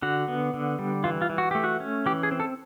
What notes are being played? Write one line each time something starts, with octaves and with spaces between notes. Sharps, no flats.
D3 F#4
B3
D3
G3
E3 F4
F4
E3
F#4
A3 G4
F#4
C#4
E3 G4
G#4
C4
A4